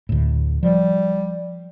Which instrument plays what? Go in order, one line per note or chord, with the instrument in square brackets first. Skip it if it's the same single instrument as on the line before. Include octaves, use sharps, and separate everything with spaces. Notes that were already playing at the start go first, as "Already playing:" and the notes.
[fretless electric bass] D2 A2
[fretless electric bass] F3 [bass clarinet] G3